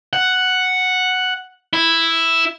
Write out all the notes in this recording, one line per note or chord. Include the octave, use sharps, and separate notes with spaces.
F#5
E4